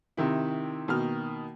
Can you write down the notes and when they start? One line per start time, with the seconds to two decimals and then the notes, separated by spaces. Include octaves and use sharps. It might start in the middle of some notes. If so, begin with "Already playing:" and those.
0.17 C3 D#3 E4
0.88 B2 D#3 A#3 F6